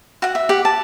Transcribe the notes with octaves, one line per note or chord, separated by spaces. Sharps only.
F#4 F#5
E5
G4 F#5
A5